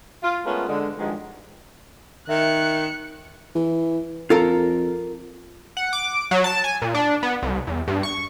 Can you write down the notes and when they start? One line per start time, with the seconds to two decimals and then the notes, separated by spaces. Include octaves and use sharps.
0.23 F4
0.45 G#3 A3 B3 C#4 F4 A#4
0.67 D3 G#3
0.98 G2 D#3 F3 F#3 G#3
2.29 D#3 E5 F#6 C#7
3.55 E3
4.30 F2 F4 A4 A#4
5.77 F#5
5.93 D6
6.31 F#3
6.44 A5
6.64 G#5
6.82 A#2
6.94 D4
7.23 B3
7.42 C2
7.67 E2
7.88 G2
8.03 C#6